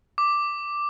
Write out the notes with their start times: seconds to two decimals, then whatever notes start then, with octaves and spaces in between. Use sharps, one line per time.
0.18 D6